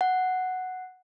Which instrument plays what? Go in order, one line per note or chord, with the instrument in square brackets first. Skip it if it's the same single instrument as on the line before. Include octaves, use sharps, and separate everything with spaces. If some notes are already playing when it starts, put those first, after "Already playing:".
[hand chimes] F#5